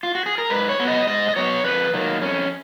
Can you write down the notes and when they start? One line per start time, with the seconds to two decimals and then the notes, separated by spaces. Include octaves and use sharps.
0.03 F4
0.15 F#4
0.26 G#4
0.38 A#4
0.50 G#2 B4
0.69 C#5
0.79 F#3 B3
0.88 D#5
1.07 G#2 D#5
1.29 D#5
1.36 F#3 B3 C#5
1.64 F2 B4
1.94 D#3 F#3 A#3
2.21 F2 C#4